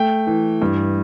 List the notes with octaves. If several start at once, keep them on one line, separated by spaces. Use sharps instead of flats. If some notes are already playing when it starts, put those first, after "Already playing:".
Already playing: A3 G5
E3
G2